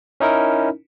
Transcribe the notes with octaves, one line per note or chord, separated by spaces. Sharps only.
C#4 D#4 E4 A#4